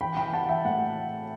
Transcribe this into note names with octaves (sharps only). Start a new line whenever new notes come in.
E3 G5 B5
G5 B5
E3
F#5 A5
E3
E5 G5
A2 F#5